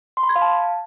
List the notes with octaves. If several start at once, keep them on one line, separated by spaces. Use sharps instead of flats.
C6
B5
G#6
F5
A5